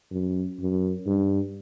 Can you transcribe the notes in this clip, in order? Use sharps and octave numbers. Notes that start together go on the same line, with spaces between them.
F#2
F#2
G2